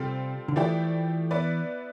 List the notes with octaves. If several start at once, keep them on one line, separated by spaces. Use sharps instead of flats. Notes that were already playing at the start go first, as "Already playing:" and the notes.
Already playing: C3 G3 C4 F4 A4
D3
E3 F3 A3 E4 G4 D5
B3 E4 B4 D5